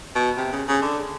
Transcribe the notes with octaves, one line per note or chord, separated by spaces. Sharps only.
B2
C3
C#3
C#3
D3